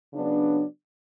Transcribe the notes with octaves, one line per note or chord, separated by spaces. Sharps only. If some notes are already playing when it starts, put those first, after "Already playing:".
C#3 F#3 B3 D4